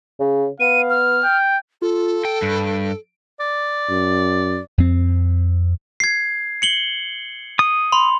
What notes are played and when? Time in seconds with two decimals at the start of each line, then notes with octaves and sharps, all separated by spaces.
0.20 C#3
0.60 B3 F5 D#7
0.90 F6
1.24 G5
1.82 F4 A4
2.25 G5 D7
2.42 G2
3.40 D5
3.90 F#2
4.78 F2 C4
6.00 G#6 C7
6.62 C#7 F#7 G7
7.59 D#6
7.92 B5 C6